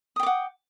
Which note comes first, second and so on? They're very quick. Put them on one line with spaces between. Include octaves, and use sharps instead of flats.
D#6 G5 D6 F#5